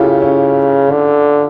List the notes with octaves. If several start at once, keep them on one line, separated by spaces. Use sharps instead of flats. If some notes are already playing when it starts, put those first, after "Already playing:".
Already playing: C#3 E4 F4 G4 A4
C#4
D3